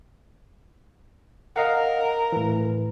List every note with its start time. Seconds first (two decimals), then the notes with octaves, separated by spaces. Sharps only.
1.56 A#4 D#5 F5 F#5
2.32 A2 E3